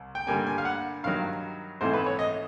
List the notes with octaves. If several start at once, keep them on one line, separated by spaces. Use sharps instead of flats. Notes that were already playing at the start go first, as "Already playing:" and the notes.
Already playing: C2
G5
G2 D3 G3 A#3 G#5
G#5
F5
F#5
G2 D#3 F#3 F5
G#1 G#2 E3 A3 C4 C5
B4
C#5
D#5